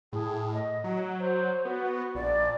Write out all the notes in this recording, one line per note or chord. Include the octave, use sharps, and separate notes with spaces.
A2 G#4
D#5
F#3
C5
B3 F#4
A#1 D5